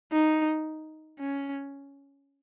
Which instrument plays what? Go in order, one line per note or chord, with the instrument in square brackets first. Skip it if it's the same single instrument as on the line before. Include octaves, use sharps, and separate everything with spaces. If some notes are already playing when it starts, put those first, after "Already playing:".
[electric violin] D#4
C#4